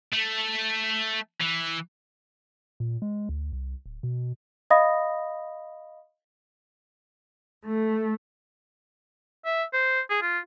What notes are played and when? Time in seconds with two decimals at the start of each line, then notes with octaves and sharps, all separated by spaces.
0.13 A3
1.41 E3
2.80 A#2
3.02 G#3
3.29 D2
3.53 C2
3.86 D1
4.03 B2
4.70 D#5 F5 B5 D#6 A#6
7.66 A3
9.45 E5
9.73 C5
10.10 G#4
10.22 F4